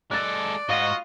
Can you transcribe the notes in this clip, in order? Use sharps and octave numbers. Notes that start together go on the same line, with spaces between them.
G#3 A4 D5 F#6 A6
G#2 F4 F#4 D#5 F5